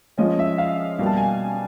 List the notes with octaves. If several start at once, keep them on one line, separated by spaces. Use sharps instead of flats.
F3 G#3 C#4 D#5
E5
F5
B2 G3 A#3
A5
G#5